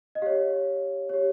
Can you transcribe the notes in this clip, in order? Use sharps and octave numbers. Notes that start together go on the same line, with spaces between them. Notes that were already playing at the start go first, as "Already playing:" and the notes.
D#5
G4 C#5 F5
G4 C#5